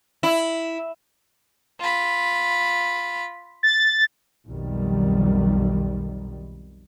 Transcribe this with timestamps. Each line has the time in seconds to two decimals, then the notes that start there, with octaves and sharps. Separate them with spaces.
0.23 E4
1.80 F4 B5
3.63 A6
4.48 B1 F2 D#3 G3